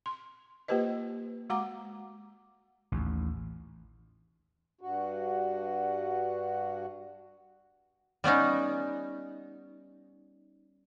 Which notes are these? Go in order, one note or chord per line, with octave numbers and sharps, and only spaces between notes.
C6
A#3 F4 G4 B4 C5 D#5
G#3 F#4 F#5 A#5 D6
A1 D#2
G2 F#4
G3 B3 C#4 D#4